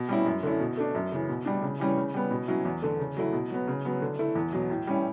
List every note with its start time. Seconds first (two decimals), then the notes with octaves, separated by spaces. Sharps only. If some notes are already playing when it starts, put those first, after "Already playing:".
Already playing: B2
0.09 G3 C#4 E4
0.26 F#2
0.43 D3 A3 C#4 E4
0.60 B2
0.77 A3 D4
0.95 F#2
1.12 C#3 E3
1.29 B2
1.45 G3 D4
1.62 C#3
1.80 E3 G3 C#4
1.97 C#3
2.14 G3 B3
2.31 B2
2.48 F#3 C#4 E4
2.65 E2
2.82 D3 A3
2.99 C#3
3.17 F#3 A3 E4
3.33 B2
3.50 F#3 B3
3.68 C#3
3.85 F#3 B3
4.02 D3
4.19 A3 E4
4.35 E2
4.53 B2 F#3
4.70 A2
4.87 G3 C#4 E4